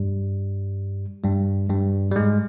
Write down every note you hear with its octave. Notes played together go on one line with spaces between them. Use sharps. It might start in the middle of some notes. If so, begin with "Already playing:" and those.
Already playing: G2 G3
G2 G3
G2 G3
G3
G#2 G#3